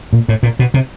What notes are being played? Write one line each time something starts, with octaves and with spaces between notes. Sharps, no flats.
A#2
A2
A#2
B2
C3